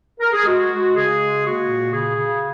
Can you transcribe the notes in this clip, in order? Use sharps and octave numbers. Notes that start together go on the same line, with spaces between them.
A#4
G#4
G#3 F#4
G#3
C#3 G#4
G#3
A#3 F#4
A#2
C#3 G#4
C#3